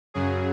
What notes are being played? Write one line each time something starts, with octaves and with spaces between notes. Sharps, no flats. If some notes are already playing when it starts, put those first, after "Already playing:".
F#2 C#3 F#3 G#4